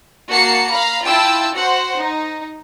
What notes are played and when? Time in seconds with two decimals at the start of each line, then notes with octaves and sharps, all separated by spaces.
0.29 A#3 F#4 A5 C7 C#7
0.70 F5 A#5 B5
1.05 E4 F4 G5 A5 E6
1.55 F#4 C5 F#5
1.99 D#4